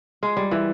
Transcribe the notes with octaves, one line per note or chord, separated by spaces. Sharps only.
G#3
G3
E3